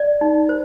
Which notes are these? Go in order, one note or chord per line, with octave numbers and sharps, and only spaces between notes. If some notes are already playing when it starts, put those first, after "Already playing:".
Already playing: D5
D#4
C5